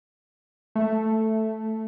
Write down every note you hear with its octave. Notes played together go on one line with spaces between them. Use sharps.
A3